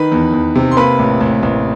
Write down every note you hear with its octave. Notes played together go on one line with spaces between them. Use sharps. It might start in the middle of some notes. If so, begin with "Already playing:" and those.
Already playing: D#3 B4 B5
E2
E2
C3
C6
A#3 B4 B5
A1
A1
A1